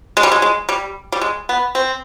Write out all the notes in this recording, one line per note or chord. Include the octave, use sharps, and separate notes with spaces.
G#3
G3
G#3
G#3
G3
G3
G#3
B3
C4